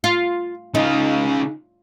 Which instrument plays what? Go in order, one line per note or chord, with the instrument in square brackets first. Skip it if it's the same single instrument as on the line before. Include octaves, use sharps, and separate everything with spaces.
[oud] F4
[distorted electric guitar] C#3 F4 [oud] D#4